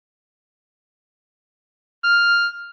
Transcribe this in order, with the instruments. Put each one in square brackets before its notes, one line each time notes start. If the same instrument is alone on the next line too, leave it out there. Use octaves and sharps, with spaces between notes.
[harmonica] F6